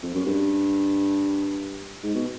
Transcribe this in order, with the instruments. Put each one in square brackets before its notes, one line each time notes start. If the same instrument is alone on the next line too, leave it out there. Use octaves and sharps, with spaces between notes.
[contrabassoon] F2
F#2
G2
G#2
B2